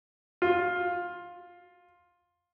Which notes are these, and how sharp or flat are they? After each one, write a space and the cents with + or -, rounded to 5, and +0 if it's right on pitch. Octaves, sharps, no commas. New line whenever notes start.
F4 +10